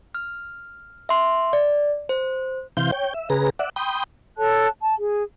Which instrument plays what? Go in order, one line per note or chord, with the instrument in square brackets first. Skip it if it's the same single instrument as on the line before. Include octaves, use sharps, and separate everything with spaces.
[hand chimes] F6
E5 C6
D5
C5
[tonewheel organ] C3 E3 F5 C6 G6
C#5 G5
E5
C#3 G#4 B4 A#5
D5 E5 F#5
G5 B5 C6 D#6
[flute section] A4 C#5 A5 F#6
A5
G#4